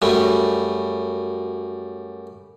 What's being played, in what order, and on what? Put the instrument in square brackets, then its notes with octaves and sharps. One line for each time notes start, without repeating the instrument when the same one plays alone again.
[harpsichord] F#2 G3 A3